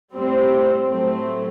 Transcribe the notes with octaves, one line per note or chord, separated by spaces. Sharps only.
A2 G3 C4
A2 F#3 A3 C4